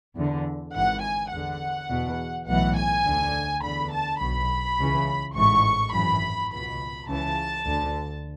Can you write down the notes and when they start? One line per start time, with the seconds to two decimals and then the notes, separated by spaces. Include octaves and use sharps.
0.17 E2 D3
0.74 G#1 G#2 E3 F#5
1.03 G#5
1.32 E2 D3 F#5
1.89 E2 B2
2.48 B1 A2 E3 F#5
2.76 G#5
3.06 D2 D3
3.62 E2 D3 B5
3.92 A5
4.20 B1 B2 B5
4.78 C#2 C#3 E3
5.35 A1 G#2 E3 C#6
5.93 G#1 F#2 E3 B5
6.51 C#2 B2 B5
7.09 C#2 C#3 E3 A5
7.66 D2 D3